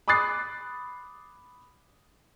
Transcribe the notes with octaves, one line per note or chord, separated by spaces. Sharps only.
B5 D6 D#6 F#6 A6 C7